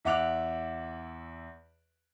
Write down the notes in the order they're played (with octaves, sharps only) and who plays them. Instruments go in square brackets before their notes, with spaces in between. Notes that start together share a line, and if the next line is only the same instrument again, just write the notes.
[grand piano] E2 E5 F#5 D6 F#6 F7